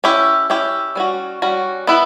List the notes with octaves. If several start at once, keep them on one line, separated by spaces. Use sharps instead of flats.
C#4 E4 G4
C#4 E4 G4
G3 C#4 F#4
G3 C#4 F#4
B3 E4 B4